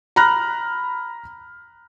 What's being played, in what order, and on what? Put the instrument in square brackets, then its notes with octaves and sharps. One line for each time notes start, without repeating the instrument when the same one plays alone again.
[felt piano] A#5 B5 F6 F#6 A#6